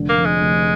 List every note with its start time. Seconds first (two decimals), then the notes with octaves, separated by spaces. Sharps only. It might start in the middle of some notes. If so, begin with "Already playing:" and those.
Already playing: F1 D3
0.09 A#3
0.17 F2
0.25 G#3
0.41 F1